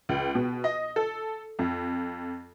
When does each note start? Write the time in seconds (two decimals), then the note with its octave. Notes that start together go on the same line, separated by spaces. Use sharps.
0.09 C#2
0.35 B2
0.64 D#5
0.96 A4
1.59 F2